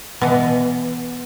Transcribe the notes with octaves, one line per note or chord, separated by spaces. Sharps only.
B2 E3